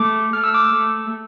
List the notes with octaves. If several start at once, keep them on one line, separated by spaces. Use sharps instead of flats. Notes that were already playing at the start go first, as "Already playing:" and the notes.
Already playing: A3 D6
A3 F6
E6
D6
E6
A3